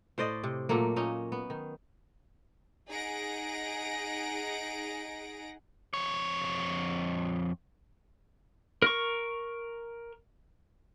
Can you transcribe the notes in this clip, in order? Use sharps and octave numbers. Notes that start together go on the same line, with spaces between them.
A2 C5 D5 D#5
C3
A#2 F#3 A3 A#3
A#2 C#4 D#4
B3
D#3
D#4 G#4 F#5 A#6 D7
F2 C#5
A#4 C#6